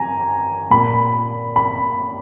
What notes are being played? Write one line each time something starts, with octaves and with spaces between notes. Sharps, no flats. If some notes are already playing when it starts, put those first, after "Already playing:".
Already playing: G#5 A#5
A#2 B5
B5